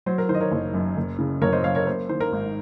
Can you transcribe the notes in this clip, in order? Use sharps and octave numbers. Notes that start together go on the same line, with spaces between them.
F#3 C5
A#4
D#3 C5
D#5
A#4 C#5
F#1
F#2
F#1
C#3
F#1 A#4 C#5
C5 D#5
F#2 C#5 F5
A#4 C#5
A#3 C5
D#3 C5
A#4
G#1